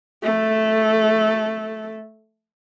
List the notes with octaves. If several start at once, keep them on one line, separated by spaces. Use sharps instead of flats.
A3 A4